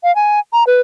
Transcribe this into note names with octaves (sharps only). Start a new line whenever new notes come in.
F5
G#5
A#5
B4